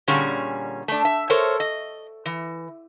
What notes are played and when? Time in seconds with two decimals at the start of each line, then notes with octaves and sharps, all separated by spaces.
0.08 A#2 D3 G3 C#4 G#4
0.88 A3 D4
1.05 E5
1.30 A4 A#4 C5 C#5
1.60 D#5
2.26 E3